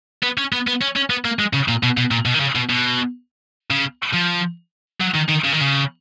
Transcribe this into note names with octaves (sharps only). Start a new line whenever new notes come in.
B3
C#4
B3
B3
C#4
C#4
B3
A#3
G#3
C#3
A#2
B2
B2
A#2
B2
D#3
C#3
B2
B2
C#3
F3
F#3
D#3
D#3
C#3
D#3
C#3